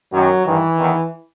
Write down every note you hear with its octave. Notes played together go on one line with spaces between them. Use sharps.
F#2 D#3 F#3
G2 D#3 E3
E2 D#3